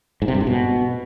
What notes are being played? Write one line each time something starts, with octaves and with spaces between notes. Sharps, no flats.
G#2
C3
G2
A2
B2